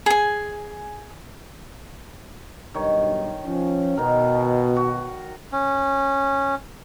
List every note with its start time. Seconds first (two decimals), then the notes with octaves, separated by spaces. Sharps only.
0.06 G#4 G#5
2.75 B1 G2 D#3 C#5
3.44 F3 C#4
3.97 B2 D#3 A#4
4.76 F#4
5.52 C#4